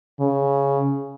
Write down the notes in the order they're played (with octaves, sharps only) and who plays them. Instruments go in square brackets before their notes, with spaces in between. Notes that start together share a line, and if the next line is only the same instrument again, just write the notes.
[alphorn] C#3